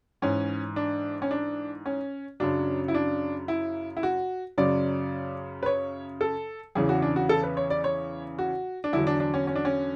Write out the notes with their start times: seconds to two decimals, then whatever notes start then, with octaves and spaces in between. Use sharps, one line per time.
0.22 G#2 E3 C#4
0.76 D4
1.22 C#4
1.31 D4
1.86 C#4
2.40 F#2 C#3 F#3 D4
2.88 E4
2.95 D4
3.48 E4
3.97 E4
4.03 F#4
4.58 F#2 C#3 F#3 D5
5.63 B4
5.66 C#5
6.21 A4
6.75 E2 C#3 E3 G#4
6.89 F#4
7.02 D4
7.16 F#4
7.29 A4
7.43 B4
7.57 C#5
7.70 D5
7.84 C#5
8.39 F#4
8.84 D4
8.93 E2 D3 F#3 E4
9.07 D4
9.20 D4
9.34 C#4
9.47 C#4
9.56 D4
9.65 C#4